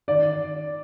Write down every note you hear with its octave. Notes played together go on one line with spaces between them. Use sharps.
D#3 D5